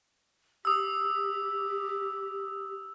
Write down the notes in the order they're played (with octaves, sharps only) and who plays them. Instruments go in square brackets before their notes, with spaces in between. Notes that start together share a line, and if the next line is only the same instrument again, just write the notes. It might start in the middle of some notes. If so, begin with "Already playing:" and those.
[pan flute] G4 [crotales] D#6 E6